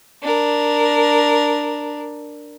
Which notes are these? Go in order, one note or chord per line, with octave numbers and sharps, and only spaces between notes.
D4 A#4